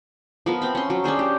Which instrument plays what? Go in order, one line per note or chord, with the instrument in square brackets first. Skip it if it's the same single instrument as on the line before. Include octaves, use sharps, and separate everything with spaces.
[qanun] F3 B3 A#4
C4 B5
C#4 C6
F#3
C#4 D4 G#4 C5
G4